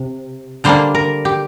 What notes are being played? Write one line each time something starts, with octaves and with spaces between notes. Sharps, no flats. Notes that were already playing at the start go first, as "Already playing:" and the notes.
Already playing: C3
D3 G3 A#3 D4 C5
A#4
G4